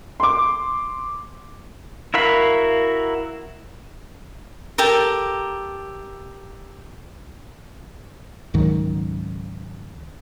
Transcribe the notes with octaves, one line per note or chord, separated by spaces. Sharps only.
C6 D6
E4 F#4 A#4 F5 B5
G4 A4 A#4
C#2 G#2 D#3 F#3